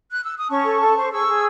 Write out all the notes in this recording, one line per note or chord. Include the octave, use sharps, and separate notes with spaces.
F#6
E6
D#6
C#4 A5 C#6
A4
A4
C5
G#4 C#6 E6
G#4